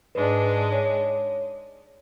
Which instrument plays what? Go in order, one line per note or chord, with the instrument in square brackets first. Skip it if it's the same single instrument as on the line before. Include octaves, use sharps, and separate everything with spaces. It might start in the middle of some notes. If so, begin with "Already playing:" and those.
[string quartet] G#2 G#3 D4 [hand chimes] B4
[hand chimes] C#5